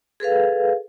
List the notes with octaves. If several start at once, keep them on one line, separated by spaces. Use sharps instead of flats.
G#4 A4 B4 F5